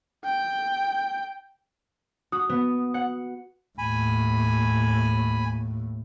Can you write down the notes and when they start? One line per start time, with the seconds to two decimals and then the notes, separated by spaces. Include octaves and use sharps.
0.24 G5
2.32 F#4 D#6
2.49 B3
2.94 F#5
3.78 D#2 A2 G#5 B5